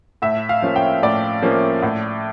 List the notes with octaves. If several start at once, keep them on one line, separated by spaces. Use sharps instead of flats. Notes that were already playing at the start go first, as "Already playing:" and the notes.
A2 E5
F5
F3 A#3 C#4
G5
A2 D5
F3 A#3 C#4
A2